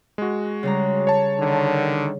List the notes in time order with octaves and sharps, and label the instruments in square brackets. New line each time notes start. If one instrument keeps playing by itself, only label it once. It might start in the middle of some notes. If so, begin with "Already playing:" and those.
[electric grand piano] G#3 F#4
[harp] C#3 G3 A#5
[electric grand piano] C#5 A5
[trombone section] D3 D#3